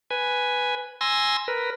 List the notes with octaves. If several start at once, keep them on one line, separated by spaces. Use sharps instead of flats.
B4 G#5
G#5 C6 E6 A#6
A#4 B4